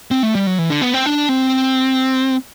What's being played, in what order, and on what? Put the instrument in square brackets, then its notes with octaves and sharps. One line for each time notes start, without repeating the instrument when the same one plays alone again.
[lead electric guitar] C4
A3
G3
F#3
E3
D3
B3
C4
D4
C4